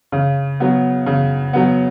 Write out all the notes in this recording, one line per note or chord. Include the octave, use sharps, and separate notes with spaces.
C#3
F#3 B3
C#3
F#3 B3